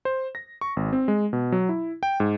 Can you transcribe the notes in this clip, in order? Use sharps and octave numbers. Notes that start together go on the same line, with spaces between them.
C5
A#6
C#6
G#1
C4
G#3
B2
F#3
E4
G5
G#2